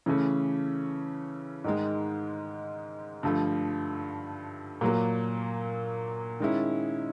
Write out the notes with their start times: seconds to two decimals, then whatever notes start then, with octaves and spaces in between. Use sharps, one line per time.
0.06 C#3 E3 A3 C#4
1.64 G#2 D#3 G#3
3.23 G2 D3 F3 A3
4.81 A#2 F#3 A#3
6.40 D#3 G#3 C#4 E4